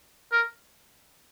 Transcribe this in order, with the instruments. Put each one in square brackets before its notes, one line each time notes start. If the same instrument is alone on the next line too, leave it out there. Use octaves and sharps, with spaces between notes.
[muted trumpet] A#4